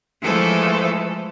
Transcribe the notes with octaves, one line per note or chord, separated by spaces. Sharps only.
E3 F3 G#3 A3 A4 C5